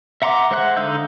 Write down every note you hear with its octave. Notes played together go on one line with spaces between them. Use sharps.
E5 F#5 A#5 C6 D6
G#3 C5 E5 F#5 F#6
D3 D#4 F5 E6 G6